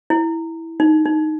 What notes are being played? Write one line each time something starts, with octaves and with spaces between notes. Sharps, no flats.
E4
D#4
D#4